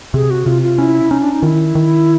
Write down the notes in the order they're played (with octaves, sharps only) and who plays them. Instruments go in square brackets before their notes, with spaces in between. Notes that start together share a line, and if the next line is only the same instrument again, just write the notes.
[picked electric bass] C3 [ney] G#4
[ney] F#4
[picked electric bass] C3 [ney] F4
[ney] F4
[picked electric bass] C#4 [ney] E4
[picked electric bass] C#4 [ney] D#4
[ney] D4
D#4
[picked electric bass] D#3 [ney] E4 F4
[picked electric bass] D#3